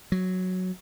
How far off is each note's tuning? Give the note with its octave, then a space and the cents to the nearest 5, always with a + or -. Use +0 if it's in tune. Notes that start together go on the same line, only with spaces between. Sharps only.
F#3 -5